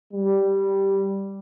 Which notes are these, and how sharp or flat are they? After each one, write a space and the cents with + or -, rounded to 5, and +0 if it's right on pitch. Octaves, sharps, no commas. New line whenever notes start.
G3 -5